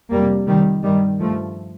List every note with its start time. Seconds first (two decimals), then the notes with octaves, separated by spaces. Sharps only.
0.10 F2 C3 G3 A#3
0.47 F2 C3 D#3 G3
0.84 G2 D#3 G3
1.20 G2 F3 A3